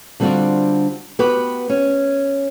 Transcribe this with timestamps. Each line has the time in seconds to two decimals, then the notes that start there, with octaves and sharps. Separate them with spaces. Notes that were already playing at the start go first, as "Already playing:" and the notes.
0.20 D3 G3 C4 D4 F4 F#4
1.19 B3 F#4 G4 B4
1.70 C#4